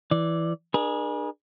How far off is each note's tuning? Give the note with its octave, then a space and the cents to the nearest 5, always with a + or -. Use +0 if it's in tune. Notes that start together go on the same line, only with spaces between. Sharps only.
E3 +0 D5 -5
D4 +40 G#4 +0 B4 -45